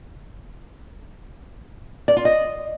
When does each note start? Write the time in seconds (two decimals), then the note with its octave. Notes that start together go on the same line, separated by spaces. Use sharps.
2.08 D5
2.17 F4
2.25 D#5